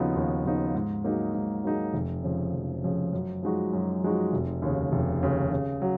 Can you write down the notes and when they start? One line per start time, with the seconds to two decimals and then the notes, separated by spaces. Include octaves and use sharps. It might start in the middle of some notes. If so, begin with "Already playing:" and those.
Already playing: D#2 C#3 F3 B3 D#4
0.15 D#2
0.44 C#3 F3 B3 D#4
0.75 G#2
1.04 F#3 A#3 D#4 G#4
1.35 G#2
1.64 F#3 A#3 D#4 G#4
1.93 F1
2.23 F2 C#3
2.54 F1
2.84 F2 C#3
3.13 F#2
3.43 F3 G#3 D#4 F#4
3.73 F#2
4.03 F3 G#3 D#4 F#4
4.33 F1
4.62 D#2 C#3
4.92 F1
5.23 D#2 C#3
5.52 C#3
5.82 F#3